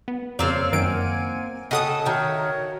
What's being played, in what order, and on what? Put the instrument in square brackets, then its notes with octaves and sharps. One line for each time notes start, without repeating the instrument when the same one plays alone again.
[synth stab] B3
[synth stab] F2 C#3 [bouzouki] A#3 C4 F5 [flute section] C#5 D5 E6
[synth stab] F#2 D#3 D7 [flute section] F#5 G#5 G#6
[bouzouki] C#3 A4 [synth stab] D#5 F#5 D#6 [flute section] G5
[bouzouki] D#3 G5 [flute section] F#4 C#5 E5